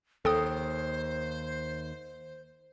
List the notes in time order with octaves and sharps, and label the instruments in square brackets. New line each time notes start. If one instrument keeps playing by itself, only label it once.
[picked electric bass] D#2 [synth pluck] A4 G5 D#6 [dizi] C5